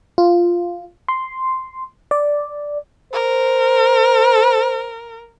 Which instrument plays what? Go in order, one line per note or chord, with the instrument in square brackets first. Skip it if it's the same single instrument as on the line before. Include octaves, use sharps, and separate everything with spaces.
[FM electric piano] F4
C6
D5
[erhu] A#4 [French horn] C5